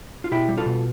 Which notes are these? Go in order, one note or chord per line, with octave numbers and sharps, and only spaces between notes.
F4
B2 E4 G4
G3
F4 A4
B2